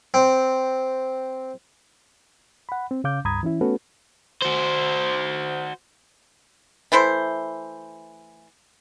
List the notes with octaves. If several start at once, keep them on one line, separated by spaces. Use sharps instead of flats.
C4
F#5 B5
C4
C#3 C#4 F5 D6 G6
C#2 G2 A#5 B5 D#6 G#6
E3 C#4 E4
A3 B3 C#4 F#4 A4 B4
F#4 C5
E3 A3 E4 C5